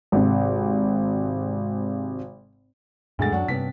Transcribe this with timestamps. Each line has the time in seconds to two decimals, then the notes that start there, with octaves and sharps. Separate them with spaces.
0.12 G#1 C3
3.19 D2 G2 B2 D3 G#3 A6
3.32 F#2 F#3 D4 F#5
3.48 G2 C3 B3 C#4 B6